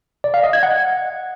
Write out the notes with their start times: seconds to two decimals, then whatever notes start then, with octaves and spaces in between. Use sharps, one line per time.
0.24 D5
0.34 F5
0.44 D#5
0.53 G#6
0.63 F#5